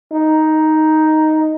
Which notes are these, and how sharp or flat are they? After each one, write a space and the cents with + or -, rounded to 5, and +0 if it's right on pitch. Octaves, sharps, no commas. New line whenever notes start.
D#4 +5